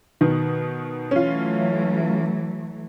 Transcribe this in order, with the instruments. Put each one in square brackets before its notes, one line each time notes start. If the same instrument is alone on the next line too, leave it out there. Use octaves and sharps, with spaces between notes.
[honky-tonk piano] B2 D#3
[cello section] E3 F#3 A3 [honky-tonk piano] C#4 F4